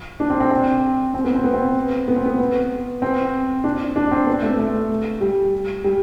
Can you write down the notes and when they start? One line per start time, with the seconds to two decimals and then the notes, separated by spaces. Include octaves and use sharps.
0.20 D4
0.30 C4
0.40 C4
0.51 C4
1.14 C4
1.24 B3
1.35 C4
1.44 B3
1.54 C4
2.08 B3
2.16 C4
2.26 B3
2.39 B3
3.02 C4
3.64 D4
3.96 D4
4.11 C4
4.27 B3
4.42 A3
4.59 A3
5.21 G3
5.84 G3